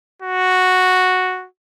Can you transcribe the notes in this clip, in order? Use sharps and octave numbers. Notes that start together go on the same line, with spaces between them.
F#4